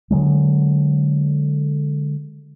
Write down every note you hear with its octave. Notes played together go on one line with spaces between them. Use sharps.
D3 D#3 F#3 G#3